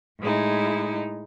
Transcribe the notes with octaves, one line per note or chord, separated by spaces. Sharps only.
A2 G#3 D#4 E4